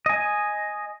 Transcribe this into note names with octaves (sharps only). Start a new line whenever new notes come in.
D#5 G#5